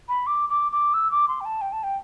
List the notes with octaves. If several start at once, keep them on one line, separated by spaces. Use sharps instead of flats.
B5
D6
D6
D6
E6
D6
C6
G5
A5
G5
A5
G5